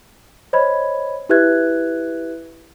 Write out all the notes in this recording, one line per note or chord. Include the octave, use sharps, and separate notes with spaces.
C5 C#5 D#5 B5 G#6
E4 G4 B4 E5 F#6 G#6